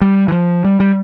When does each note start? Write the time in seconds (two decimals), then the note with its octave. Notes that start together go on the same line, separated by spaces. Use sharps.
0.01 G3
0.28 E3
0.32 F3
0.65 G3
0.80 G3